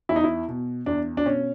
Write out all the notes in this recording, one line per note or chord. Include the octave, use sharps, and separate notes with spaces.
E2 E4
D#4
E4
B2
E2 D4
D4
B2 C#4